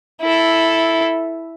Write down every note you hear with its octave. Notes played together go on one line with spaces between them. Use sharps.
E4 A4